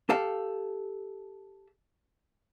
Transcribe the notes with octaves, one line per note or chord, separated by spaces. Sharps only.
G4 A4 F5